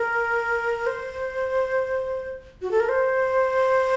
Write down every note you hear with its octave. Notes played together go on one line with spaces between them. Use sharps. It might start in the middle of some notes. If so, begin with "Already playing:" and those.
Already playing: A#4
C5
F#4
A4
A#4
C5